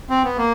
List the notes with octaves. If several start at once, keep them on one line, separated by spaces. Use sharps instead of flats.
C4
B3
A#3